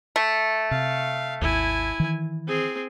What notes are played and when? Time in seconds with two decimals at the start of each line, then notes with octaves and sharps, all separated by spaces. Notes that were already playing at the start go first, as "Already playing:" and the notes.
0.16 A3
0.71 C3 F5
1.42 G#1 D#2 E4 G#5
2.00 D#3 E3
2.48 C4 G#4